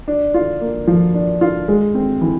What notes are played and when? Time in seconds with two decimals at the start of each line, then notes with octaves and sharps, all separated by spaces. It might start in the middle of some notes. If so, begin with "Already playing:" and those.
0.08 D4
0.34 F4
0.61 A#3
0.87 F3
1.14 D4
1.41 F4
1.68 G#3
1.95 C4
2.21 E3